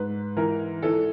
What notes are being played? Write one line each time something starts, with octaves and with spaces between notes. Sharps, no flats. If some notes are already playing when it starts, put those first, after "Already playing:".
Already playing: G#2 B4
E3 A#4
E3 A4